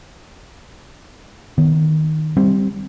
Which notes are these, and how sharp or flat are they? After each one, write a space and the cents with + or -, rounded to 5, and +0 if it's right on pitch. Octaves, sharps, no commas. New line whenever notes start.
D#3 +0 B3 +0
G3 +0 C4 +0